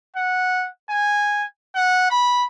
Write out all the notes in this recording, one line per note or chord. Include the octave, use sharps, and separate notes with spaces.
F#5
G#5
F#5
B5